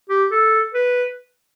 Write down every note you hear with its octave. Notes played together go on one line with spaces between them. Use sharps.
G4
A4
B4